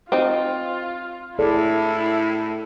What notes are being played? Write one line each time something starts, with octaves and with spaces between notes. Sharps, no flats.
C4 D#4 F4
A2 E4 G#4 A4 D5